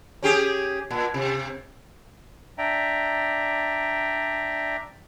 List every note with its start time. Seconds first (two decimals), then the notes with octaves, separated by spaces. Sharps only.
0.23 C#4 G4 G#4
0.91 A#2
1.14 C3
2.58 D4 D5 E5 G5 A#5